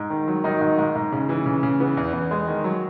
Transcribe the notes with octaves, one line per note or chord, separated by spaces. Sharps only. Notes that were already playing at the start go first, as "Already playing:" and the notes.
Already playing: G#2
D#3
F#3
D#3 F#3 D#4
G#2
G#2
G#2
C#3
E3
C#3
C#3
E3 B3
E2
E2
G#3
D#3
F#3